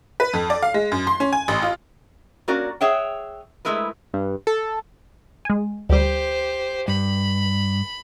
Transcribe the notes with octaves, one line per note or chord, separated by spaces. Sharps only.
B4
F2
D5
F5
G#3
F#2
C6
C#4
G#5
A1
F4
A#3 C#4 F#4 A#4 D5
G#4 C#5 E5 F#5 G5
G#3 A3 E4 A#4 B4
G2
A4
G#3 G#5
D2 G3 G4 C5
G2 B5